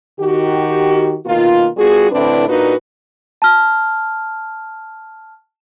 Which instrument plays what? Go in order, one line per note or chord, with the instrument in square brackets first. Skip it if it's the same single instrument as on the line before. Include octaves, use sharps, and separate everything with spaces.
[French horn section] D#3 F#4 G4
B2 D#3 A#3 F4
G3 B3 F4 F#4 G#4
A2 D3 C4 D4 E4 B4
A#2 A#3 D4 D#4 F#4 B4
[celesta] A5 F6